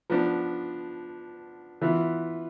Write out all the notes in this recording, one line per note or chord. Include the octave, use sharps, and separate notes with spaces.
F3 B3 D4
E3 B3 F4